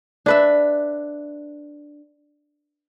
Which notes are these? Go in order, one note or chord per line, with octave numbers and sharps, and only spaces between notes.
D4 B4 E5